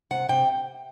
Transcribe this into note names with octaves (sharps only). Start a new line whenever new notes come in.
C3 F#5
C3 G5